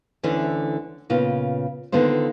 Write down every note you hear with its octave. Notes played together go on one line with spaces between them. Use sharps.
D2 D3 E3 C#4 D4
A#2 C#3 B3 F4
D3 D#3 B3 F4 C5